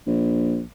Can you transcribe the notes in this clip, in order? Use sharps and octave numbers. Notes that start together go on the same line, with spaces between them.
A#1